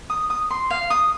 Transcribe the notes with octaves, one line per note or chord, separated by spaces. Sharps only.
D#6
D#6
C6
F5
D#6